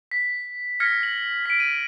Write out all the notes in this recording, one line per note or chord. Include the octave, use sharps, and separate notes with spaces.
B6
F6 G#6 A#6 B6 C#7
F#7
B6 D7
D#7